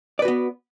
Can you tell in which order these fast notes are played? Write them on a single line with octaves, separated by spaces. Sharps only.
D5 B4 F#4 B3